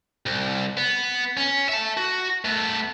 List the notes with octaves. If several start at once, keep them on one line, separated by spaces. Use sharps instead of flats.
C2
B3
C#4
E5 A5
F#4
A3 B3